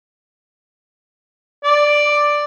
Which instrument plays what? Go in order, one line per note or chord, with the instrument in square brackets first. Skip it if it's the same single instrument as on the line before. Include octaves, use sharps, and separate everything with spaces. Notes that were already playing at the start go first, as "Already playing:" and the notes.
[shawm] D5